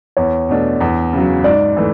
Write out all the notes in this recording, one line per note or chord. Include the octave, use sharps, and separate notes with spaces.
E2 C#5
B2 A3 D4
E2
C#3 F#3
G#2 D5
E3 A3